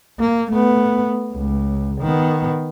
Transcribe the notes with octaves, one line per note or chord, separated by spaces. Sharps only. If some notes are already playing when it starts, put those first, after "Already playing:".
A#3
A3 B3
C#2
D#3 B3